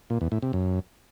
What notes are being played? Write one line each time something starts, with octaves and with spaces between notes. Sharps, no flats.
A#2
E2
A2
C3
F#2